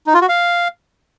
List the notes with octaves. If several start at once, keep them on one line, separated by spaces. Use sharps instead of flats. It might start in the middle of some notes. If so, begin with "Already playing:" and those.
D#4
F4
F#4
F5